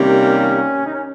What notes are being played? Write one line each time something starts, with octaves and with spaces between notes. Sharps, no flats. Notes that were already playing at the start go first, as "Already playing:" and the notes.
Already playing: C3 D#3 G3 A#3 C#4
D#4
C#4